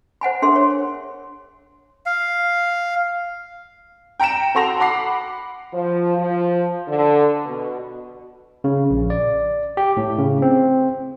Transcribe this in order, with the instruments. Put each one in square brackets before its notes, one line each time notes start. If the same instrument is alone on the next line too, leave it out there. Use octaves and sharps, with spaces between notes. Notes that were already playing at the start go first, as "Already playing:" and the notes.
[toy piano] C5 F#5 G#5 B5
D4 G#4 A#4 E5 C6
C#5
[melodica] F5
[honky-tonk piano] G5 A#5 C#7 D7 E7
F#4 A4 C6 A#6 F7
F#5 B5 D6 C7
[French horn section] F3
F3
D3
B2
[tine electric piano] C#3
A#1
D5
G4
A2
C#3
C4